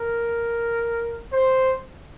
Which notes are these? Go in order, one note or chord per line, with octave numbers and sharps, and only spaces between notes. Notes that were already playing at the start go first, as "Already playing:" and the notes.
Already playing: A#4
C5